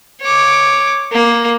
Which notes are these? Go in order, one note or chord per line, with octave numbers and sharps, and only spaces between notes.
C#5 D6
A#3